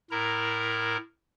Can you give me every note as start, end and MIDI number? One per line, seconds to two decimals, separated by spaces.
0.11 0.97 45
0.11 0.97 64
0.11 0.97 70
0.11 0.97 82